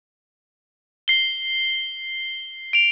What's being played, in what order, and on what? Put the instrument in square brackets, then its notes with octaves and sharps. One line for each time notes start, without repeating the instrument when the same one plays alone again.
[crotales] C7 G7
D7 F7